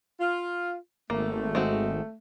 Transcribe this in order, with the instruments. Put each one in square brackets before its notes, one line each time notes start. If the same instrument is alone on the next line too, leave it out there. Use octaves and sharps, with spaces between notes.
[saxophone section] F4
[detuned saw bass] G#1 [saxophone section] A3 [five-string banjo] A#3
[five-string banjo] G#3 C4 F#4